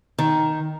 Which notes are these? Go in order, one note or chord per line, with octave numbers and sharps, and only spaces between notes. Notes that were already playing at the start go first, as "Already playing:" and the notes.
D#3